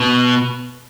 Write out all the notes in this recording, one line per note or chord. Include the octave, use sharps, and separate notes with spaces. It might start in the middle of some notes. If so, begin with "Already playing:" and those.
Already playing: B2